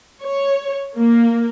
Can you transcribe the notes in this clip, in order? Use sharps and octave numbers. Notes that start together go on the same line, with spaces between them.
C#5
A#3